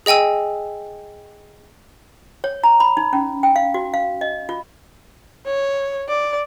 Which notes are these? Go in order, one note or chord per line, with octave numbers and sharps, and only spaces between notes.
G#4 D#5 G5 G#5 E6
C#5
A#5
B5
D#4
C#4
G5
F5
F#4
F5
D#5
F4
C#5
D5